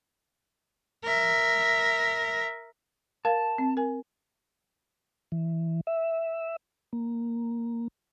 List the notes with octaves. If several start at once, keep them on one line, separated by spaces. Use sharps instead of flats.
A#4 E5
A#4 F5 A5
C4
A#4 G#5
E3
E5
A#3